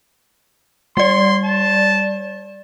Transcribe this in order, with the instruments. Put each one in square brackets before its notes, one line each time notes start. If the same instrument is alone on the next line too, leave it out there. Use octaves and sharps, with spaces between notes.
[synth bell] G3 D5 [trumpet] C6
[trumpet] A5